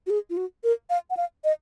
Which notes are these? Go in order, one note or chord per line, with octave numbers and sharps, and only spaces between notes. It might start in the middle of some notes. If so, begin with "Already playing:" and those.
F#4
G#4
F4
F#4
A#4
F5
F#5
F5
D#5